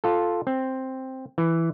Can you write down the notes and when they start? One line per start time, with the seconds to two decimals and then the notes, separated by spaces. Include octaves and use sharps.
0.04 F4 A4
0.47 C4
1.38 E3